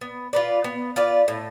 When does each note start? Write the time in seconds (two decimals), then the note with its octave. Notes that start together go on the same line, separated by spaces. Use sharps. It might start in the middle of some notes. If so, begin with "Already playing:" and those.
0.01 B3
0.33 F4 B4 D5
0.64 B3
0.96 F4 B4 D5
1.28 A2